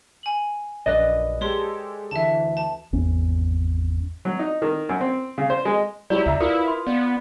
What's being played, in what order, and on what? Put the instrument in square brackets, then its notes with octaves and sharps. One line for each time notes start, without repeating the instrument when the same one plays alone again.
[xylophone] G#5 F#7
[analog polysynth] A#1 F#2 [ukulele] B4 D5 D#5
[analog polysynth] G#3 G4 A4 [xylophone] C#5 C6
[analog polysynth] D2 E3 [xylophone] E5 A5
[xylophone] A5
[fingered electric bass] G#1 E2 C#4
[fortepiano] F#3
D#4
D#3
F#2
C4
C#3
C5
G#3
[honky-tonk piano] F#3 G4 C#5 [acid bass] E4 [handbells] D5
[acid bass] C#2 [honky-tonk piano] E5 A#5
[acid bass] E4 [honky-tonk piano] F4 [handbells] A#4 B4 D#6
[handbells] C6
[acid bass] B3 [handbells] D5